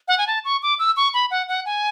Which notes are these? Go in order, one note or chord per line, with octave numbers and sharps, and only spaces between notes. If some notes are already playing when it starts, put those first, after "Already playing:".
F#5
G#5
A5
C#6
D6
E6
C#6
B5
F#5
F#5
G#5